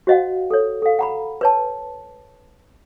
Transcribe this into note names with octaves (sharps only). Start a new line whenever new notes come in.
F#4 C5 D#5 F5 F#5
A4 C#5
A4 F5
F#5 A#5 B5
B4 C#5 A5